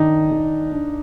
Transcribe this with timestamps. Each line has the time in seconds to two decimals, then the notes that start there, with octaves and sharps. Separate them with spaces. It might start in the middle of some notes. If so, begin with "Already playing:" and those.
Already playing: D#3 D4 D#4
0.31 D#3
0.72 D4